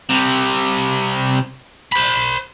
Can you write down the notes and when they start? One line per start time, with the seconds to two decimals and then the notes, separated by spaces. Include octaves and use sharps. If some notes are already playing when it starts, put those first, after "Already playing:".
0.10 C3 G3
1.92 C5 B5